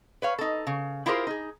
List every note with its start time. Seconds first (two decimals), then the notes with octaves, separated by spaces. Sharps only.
0.22 B4 C#5 F5
0.39 D#4 A4
0.67 C#3
1.06 E4 F4 G4 G#4 A#4 C5
1.27 D#4 G#4